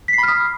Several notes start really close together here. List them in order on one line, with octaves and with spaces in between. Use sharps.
B6 C7 B5 F6 D#6